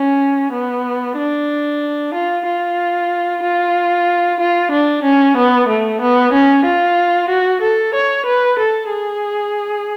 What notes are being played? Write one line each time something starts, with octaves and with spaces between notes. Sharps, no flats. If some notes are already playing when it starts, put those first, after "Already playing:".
Already playing: C#4
B3
D4
F4
F4
F4
F4
D4
C#4
B3
A3
B3
C#4
F4
F#4
A4
C#5
B4
A4
G#4